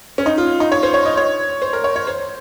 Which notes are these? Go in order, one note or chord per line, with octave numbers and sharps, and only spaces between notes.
C#4
D#4
F4
D#4
C#5
C5
C#5
D#5
C#5
C5
A#4
C#5
C#5
C5